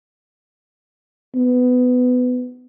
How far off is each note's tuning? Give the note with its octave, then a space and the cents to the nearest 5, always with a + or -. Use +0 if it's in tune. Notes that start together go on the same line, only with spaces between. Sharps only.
B3 +20